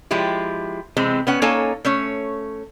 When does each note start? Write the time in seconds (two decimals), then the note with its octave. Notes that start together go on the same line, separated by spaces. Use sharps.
0.11 F3 G#3 E4 G4
0.97 C3 E3 G#3 C4
1.27 B3 C#4 F#5
1.42 A#3 C#4 D#4 A4 C#5 G#5
1.85 A3 C#4 C#5